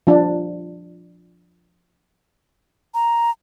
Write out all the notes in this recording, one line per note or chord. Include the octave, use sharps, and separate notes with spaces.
F3 D4
A#5